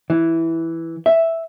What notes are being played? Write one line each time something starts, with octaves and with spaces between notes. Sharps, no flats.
E3
E5